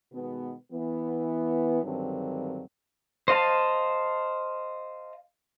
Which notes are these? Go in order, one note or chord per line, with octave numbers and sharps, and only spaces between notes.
B2 D#3 G#3 B3
E3 B3
G2 D3 D#3 F#3 C4
C5 D#5 F5 A5